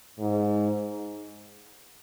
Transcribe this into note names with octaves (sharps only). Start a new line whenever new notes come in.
G#2